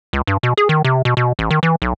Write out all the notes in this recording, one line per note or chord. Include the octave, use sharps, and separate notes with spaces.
C#2
G2
B2
G#4
D#3
C3
B2
B2
A1
D#3
E3
B1